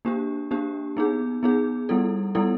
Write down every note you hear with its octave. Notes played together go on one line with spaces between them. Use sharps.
A#3 D4 G4
A#3 D4 G4
B3 D#4 G#4
B3 D#4 G#4
G3 B3 E4 A4
G3 B3 E4 A4